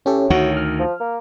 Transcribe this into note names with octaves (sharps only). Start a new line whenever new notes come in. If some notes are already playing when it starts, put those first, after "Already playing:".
A2 C#4 G4 A4
D2 D#3 F#4
F6
F3
A#3